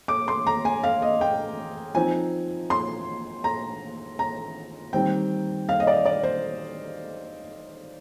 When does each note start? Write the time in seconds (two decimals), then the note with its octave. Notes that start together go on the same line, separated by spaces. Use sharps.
0.08 D6
0.28 C6
0.47 A#5
0.65 G#5
0.84 F5
1.02 D#5
1.21 G5
1.95 F3 C4 D#4 G#5
2.70 C6
3.44 A#5
4.19 A#5
4.93 D#3 G3 C4 G5
5.69 F5
5.80 D#5
5.87 D5
6.05 D5
6.23 C5